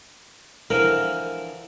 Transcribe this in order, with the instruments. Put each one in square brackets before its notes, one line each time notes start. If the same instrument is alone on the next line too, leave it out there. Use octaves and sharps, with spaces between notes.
[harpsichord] D3 E3 F3 [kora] A#4